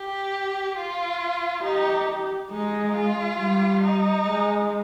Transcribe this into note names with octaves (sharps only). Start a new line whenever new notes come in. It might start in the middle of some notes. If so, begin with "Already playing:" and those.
Already playing: G4
F4
D#4 G4
G#3 D#4
F4
G3
D#4
G#3